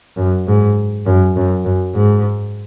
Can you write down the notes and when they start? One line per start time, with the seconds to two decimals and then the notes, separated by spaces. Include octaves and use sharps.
0.17 F#2
0.47 G#2
1.06 F#2
1.36 F#2
1.65 F#2
1.95 G#2